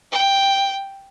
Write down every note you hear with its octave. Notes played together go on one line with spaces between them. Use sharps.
G5